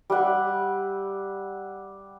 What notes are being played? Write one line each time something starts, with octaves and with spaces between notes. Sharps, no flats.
G3 E5 F#5